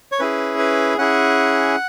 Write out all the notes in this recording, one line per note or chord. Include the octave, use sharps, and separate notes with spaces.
C#5
C#4 E4 G#4 B4
B4
C#4 E4 G#4 F#5